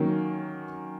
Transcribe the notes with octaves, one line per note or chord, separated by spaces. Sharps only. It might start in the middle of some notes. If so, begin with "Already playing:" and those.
Already playing: D#3 F#3 A#3 C#4